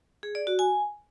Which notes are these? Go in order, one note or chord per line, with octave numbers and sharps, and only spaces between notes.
G#4
D5
F#4
G#5